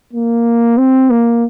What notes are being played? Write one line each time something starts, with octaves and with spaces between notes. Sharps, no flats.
A#3
C4
A#3